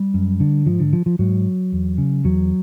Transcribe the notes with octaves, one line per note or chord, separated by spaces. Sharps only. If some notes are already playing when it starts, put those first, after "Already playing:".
Already playing: G3
F#2
D3
G#2 F3
D3
F3
F3
G#2 F#3
E2
C#3
E2 F#3